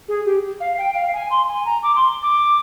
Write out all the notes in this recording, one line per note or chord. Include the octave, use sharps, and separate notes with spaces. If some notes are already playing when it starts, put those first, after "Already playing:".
G#4
G4
F5
G5
F5
G#5
C6
G#5
A#5
D6
C6
D6